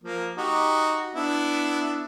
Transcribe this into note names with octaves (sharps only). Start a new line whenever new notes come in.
F3 A#3
D#4 F#4 G4
B3 D4 E4